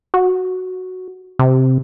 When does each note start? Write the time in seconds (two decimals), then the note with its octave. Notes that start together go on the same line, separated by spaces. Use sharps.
0.14 F#4
1.39 C3